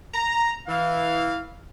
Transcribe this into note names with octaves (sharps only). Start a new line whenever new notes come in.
A#5
E3 F5